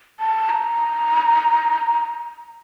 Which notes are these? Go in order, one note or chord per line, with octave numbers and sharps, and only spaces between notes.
A5
A#5